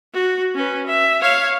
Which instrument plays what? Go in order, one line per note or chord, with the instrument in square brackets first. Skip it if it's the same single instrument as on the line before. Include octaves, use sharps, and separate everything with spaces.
[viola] F#4
C#4 B4
E5
C#5 F5